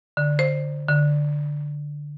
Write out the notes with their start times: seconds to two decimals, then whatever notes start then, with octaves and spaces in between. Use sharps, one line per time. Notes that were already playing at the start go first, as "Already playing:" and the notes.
0.17 D3
0.39 C5
0.89 D3